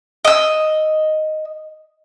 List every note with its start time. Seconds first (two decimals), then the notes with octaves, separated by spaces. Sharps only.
0.25 D#5 E6